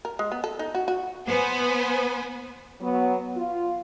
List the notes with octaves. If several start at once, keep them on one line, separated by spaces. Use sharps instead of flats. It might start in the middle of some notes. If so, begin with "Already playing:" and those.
A#4
G#3
B3
A4
D#4
F#4
F#4
B3 B4 C5 G#5
F#3 B3
F4